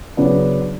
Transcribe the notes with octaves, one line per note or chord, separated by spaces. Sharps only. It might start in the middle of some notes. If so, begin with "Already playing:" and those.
C#3 F#3 B3 D4